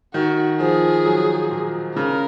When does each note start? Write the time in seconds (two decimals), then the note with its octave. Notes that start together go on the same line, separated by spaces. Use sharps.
0.14 D#3 F#4
0.60 F3 G#4
1.05 F#3
1.51 A#2
1.96 C#3 A#4